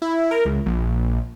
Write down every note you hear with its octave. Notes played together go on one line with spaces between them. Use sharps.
E4
A#4
C#2
A#1